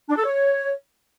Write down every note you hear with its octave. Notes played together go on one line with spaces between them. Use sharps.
D4
A4
C#5